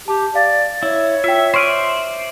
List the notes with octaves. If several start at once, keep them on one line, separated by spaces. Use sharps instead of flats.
G4 A5
D5 F5
E4 C#5
F4 E5 G5
C5 D5 E5 C#6 F6 D#7